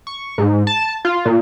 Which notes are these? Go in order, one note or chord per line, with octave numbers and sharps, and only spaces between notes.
C#6
G#2
A5
F4
A#2